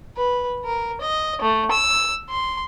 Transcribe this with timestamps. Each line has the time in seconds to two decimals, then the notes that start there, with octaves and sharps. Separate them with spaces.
0.16 B4
0.65 A#4
1.01 D#5
1.41 A3
1.71 E6
2.29 C6